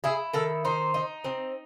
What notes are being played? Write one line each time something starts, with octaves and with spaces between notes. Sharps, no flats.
E4 G#4
D#3 A4
D#4 C5
D#4
C4